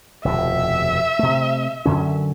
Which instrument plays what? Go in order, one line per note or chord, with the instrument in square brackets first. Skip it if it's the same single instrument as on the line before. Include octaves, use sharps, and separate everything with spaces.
[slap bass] F1 D#2 B2 [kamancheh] E5
[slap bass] C3 A3
F#2 D3 C#4